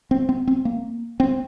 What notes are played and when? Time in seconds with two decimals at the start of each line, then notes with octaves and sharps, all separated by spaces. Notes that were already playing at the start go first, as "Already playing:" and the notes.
0.11 C4
0.29 C4
0.47 C4
0.65 A#3
1.20 C4